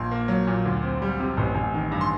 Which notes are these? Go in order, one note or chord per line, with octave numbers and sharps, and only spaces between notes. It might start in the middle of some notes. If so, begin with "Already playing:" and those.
Already playing: A#1 C6
A#3
F#3
A#2
D2
C4
G3
C3
A1
A1
D#3
G2
C6